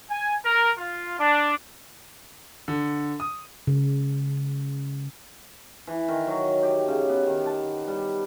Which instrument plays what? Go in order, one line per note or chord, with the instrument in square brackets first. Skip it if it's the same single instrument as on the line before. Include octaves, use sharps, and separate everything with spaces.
[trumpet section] G#5
A#4
F4
D4
[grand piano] D3
D#6
[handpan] C#3
[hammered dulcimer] E3
D#3
F#3
G4
C#3
B3
D#3
A5
G3